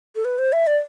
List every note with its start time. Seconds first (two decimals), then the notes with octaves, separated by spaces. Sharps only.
0.15 A4
0.25 B4
0.39 C5
0.53 E5
0.67 D5